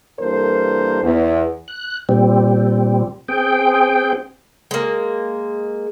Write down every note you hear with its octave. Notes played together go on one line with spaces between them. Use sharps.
G2 E3 A#3 A4 A#4 C5
E2
F#6
A#2 G3 C4
C4 G#4 G5
G#3 A#3